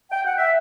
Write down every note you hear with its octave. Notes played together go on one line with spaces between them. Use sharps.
G5
F#5
E5